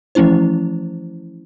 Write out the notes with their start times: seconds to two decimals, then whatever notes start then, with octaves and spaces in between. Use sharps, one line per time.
0.15 E3 F3 A3 C#4 E4 C5